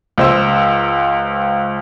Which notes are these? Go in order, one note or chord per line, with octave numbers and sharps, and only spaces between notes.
C#2 C5 E6